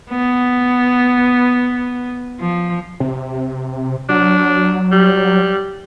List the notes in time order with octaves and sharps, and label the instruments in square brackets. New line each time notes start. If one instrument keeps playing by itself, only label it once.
[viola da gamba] B3
F3
[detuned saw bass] C3
[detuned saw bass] F#3 [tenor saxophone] D4
[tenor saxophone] G3